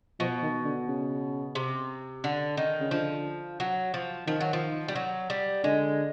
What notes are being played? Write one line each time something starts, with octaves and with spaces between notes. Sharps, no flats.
B2 F3
D#3
D3
C#3
C3
D3
D#3
C#3
D3 F3
F#3
F3
D#3 F3
F#3
F3
G3
F#3
G3
D3 G#3